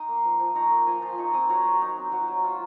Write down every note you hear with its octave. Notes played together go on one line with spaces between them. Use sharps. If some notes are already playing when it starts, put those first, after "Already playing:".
Already playing: D#4 C6 D#6
A#3
F3
F3
D#4 A#5 C#6
A#3
F3 G#5 C6
F3
D#4 A#5 C#6
C4 C6 D#6
F#3 A#5 C#6
F#3
D#4
C4
F#3 F#4
F#3
D#4 F4